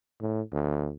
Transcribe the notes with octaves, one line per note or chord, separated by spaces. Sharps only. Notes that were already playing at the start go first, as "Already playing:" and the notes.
A2
D2